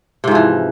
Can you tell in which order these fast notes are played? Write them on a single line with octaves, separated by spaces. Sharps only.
C3 G#2 F3 E3